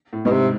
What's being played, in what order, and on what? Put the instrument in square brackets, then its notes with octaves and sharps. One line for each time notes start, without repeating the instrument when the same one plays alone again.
[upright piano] A2
[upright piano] G#2 [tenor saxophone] B2
[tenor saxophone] C3